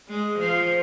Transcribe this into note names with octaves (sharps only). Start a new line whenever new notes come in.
G#3
F3